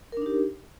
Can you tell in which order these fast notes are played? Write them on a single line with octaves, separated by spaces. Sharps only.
A#4 D4 D#4 G4